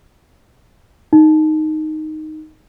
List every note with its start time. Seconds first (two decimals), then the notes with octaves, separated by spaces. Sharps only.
1.13 D#4